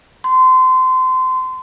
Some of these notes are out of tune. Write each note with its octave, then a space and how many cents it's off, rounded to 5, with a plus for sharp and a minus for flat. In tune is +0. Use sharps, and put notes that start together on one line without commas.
C6 -25